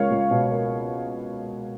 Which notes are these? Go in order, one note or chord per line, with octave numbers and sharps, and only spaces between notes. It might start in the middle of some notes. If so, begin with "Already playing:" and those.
Already playing: C#2 A#3 C#5 F5
C#2
B2
A#3